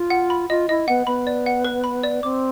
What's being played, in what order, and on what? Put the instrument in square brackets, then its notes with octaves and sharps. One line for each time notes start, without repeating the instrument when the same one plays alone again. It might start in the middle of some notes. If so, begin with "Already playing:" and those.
Already playing: [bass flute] F4
[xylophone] F#5
B5
[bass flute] F4 [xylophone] D#5
[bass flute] E4 [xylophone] D#5
[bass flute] B3 [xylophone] F#5
[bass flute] B3 [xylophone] B5
[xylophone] D5
F#5
B4
B5
D5
[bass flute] C4 [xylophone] D6